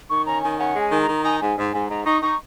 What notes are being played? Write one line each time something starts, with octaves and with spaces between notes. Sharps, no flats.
D#3 C#6
C#4 A#5
D#3 G#5
C#4 F#5
G#3
G#5
D#3
A#5
D#3
D#4 G#5
G#2 G#5
G#2
G#2 G#5
G#2 A#5
D#4 C#6
D#4 C#6